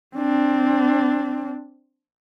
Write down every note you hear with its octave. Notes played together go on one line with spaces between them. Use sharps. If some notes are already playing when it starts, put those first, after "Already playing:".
C4 D4